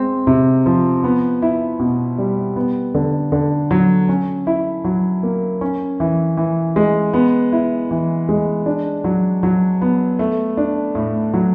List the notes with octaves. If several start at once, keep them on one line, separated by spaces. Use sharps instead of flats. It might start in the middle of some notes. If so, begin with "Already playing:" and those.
Already playing: G#3 C4
C3
F3
B3
E4
B2
G3
B3
D3
D3
F#3
C#4
E4
F#3
A#3
C#4
E3
E3
G#3
B3
E4
E3
G#3
D4
F#3
F#3
B3
A3
D4
A2
F#3